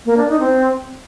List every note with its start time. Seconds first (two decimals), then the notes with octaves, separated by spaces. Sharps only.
0.05 A#3
0.17 D4
0.28 D#4
0.40 C4